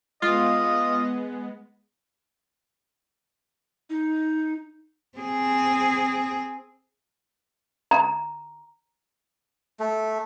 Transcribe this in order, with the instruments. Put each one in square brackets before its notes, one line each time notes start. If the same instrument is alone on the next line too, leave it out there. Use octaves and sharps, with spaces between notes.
[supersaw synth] G#3 B3 [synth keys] F4 [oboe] D#5
[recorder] D#4
[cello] C4 G#4
[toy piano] A#5
[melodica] A3